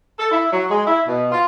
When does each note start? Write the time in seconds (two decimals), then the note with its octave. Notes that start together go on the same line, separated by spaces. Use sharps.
0.19 A4
0.32 E4
0.52 F#3
0.70 G#3
0.87 E4
1.07 B2
1.32 F4